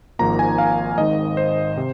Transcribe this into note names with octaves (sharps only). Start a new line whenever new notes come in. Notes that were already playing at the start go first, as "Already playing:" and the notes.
G#1 G#2 F3 A#3 A#5
G#5
F5
G#1 G#2 D#3 D#5
C5
C3